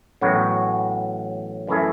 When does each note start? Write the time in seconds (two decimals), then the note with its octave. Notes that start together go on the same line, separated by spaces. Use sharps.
0.21 A1 A2 F#3 B3 F#4
1.67 F#2 E3 A3 E4 G#4